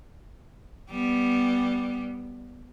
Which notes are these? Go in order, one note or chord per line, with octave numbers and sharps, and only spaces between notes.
G3 B3